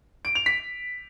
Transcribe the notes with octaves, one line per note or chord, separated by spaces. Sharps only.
D7
F7
B6